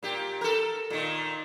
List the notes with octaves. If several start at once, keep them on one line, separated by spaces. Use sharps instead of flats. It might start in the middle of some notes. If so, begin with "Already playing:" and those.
A#2 G4
A4 A#4
A#2 D#3